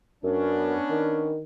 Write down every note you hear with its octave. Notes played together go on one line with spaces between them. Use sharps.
F#2 B3 C#4 D4
D#3